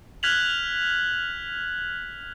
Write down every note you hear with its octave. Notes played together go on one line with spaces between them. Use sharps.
F6 F#6 G#6 B6 F7 F#7